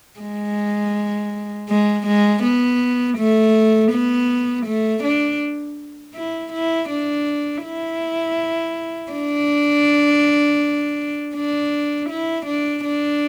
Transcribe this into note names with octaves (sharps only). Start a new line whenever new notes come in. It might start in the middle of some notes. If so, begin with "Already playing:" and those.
G#3
G#3
G#3
B3
A3
B3
A3
D4
E4
E4
D4
E4
D4
D4
E4
D4
D4